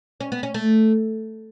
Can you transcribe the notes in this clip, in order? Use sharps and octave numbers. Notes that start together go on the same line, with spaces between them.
C#4
B3
C#4
A3